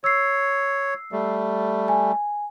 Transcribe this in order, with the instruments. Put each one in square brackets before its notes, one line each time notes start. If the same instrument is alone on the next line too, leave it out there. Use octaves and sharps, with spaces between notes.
[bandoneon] C#5 [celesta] E6 C7
[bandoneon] G3 A3
[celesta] G#5